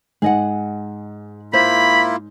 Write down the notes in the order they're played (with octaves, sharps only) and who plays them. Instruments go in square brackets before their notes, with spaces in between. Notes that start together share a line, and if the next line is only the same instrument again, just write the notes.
[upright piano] G#2 [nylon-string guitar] G#4 D#5 F#5
[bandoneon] A#3 E4 F4 [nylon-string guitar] C5 [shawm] B5